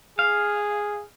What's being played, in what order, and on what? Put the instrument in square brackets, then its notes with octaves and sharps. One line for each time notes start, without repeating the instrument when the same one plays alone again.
[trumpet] G#4 [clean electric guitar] F5